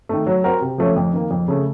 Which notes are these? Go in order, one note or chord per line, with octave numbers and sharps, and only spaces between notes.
D#3 A3
F#3
C4 F#4 A#4
C3
F3 A3 C#4
F2
D#3 A#3
F2
C#3 A3